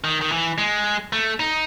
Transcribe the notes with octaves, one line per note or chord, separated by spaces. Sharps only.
D#3
D#3
E3
G#3
A3
D#4